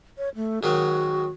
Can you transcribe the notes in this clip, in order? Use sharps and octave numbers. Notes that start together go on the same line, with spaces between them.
C#5
A3
G#2 D#3 F#3 F#4